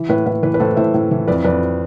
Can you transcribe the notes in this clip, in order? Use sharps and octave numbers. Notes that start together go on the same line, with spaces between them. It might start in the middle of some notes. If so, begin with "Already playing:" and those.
Already playing: E3
A2 B4
A2 B4
E3 B4
B4
A2 A4 C5
A2 C5 E5
A2
E3
F2 B4 D5
F2 B4 D5